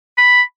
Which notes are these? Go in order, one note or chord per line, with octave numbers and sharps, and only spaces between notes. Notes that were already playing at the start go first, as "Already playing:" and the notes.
B5